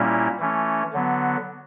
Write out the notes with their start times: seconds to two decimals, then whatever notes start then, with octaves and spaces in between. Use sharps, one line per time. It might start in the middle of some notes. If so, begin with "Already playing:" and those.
Already playing: A#2 G3 A#3 C#4 E4
0.39 E3 A3 C#4
0.93 D3 F#3 B3